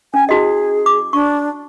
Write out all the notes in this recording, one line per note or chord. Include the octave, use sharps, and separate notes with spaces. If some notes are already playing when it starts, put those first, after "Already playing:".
C#4 G#5
E4 F#4 G#4 D#5
D6
D4 C#6